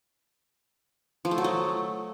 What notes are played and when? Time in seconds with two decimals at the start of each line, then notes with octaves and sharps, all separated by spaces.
1.25 F3
1.31 A3
1.38 F#3
1.44 A3